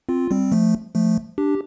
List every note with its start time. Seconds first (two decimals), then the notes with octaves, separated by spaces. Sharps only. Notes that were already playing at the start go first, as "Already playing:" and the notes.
0.09 C4 F4
0.31 G3 C4
0.52 F3 A3
0.95 F3 A3
1.38 D4 G4